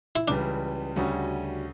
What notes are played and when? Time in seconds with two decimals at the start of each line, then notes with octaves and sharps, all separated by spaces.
0.16 E4
0.28 C#2 C#3 E3 G3 D4
0.96 D2 C#3 G3 C#4 F#4